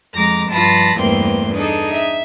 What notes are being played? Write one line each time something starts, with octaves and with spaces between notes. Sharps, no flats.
F2 G#3 A#5 D6 A#6
G2 F3 F4 A5 B5 A#6
E2 G2 A3 A#3 C4 C6
D4 D#4 G#4 A4
E5